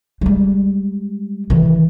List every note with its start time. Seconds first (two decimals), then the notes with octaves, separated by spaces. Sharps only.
0.21 G3 G#3
1.50 D#3 E3